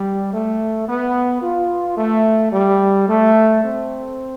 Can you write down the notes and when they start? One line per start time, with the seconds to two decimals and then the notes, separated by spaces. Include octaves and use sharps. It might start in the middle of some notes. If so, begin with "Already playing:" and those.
Already playing: G3
0.32 A3
0.88 B3
1.41 F4
1.97 A3
2.51 G3
3.07 A3
3.62 C4